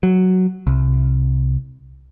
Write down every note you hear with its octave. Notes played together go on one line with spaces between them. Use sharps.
F#3
C2